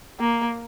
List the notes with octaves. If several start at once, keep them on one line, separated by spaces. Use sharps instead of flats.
A#3